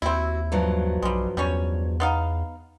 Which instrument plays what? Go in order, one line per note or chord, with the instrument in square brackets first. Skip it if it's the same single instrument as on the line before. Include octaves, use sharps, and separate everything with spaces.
[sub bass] D#2 [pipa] C4 E4 [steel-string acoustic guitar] F#4
[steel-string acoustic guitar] G2 F3 F#3
[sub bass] B1 [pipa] G3 G#3
[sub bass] E2 [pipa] G3 C#4 C#5
[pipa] B3 D#4 F5